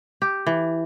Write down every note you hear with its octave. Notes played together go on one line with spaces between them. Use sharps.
G4
E3